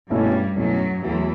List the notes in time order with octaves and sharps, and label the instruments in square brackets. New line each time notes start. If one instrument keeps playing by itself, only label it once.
[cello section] G2 G3 [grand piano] B2 A3 C#4 E4
[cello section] F#2 F#3 [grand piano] B2 A3 C#4 E4
[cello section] E2 E3 [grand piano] F#3 A3 E4